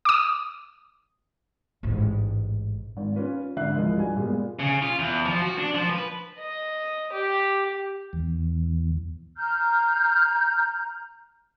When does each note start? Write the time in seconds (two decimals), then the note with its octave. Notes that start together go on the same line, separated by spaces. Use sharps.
0.05 D6 D#6
1.83 A1 G#2
2.97 G#1
3.16 C#4 F4 B4
3.56 G#1 D3 E5 F#6 C7
3.75 C#2 E3 F3 A#4 D#5
3.95 G2 F#4 G#5
4.16 A#2 G#3 B3
4.59 C#3
4.83 F4
4.99 E2
5.26 F3
5.42 F#4
5.58 D4
5.75 F3
5.90 B4
6.38 D#5
7.12 G4
8.13 E2
9.37 A#5 F6 G6